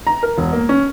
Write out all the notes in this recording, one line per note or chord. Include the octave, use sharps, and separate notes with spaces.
A#5
A#4
E1
A#3
C#4